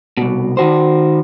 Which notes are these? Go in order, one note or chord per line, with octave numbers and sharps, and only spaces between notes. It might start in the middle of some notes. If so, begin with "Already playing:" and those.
C2 B2
D#3 F#4 C5